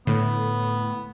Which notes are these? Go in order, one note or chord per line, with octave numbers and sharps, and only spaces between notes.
A2 D3 A3 B3